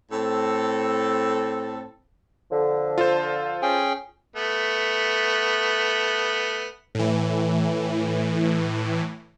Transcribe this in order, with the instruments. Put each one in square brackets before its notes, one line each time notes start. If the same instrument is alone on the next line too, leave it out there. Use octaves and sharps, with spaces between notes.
[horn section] A2 C4 A4
[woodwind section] D3 F3
[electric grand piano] F4 A4 C5
[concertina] C#4 G#4 G5
[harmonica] A3 B3
[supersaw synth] A2 E3